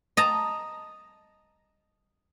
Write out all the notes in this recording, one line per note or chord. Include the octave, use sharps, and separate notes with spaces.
D#5 A5 A#5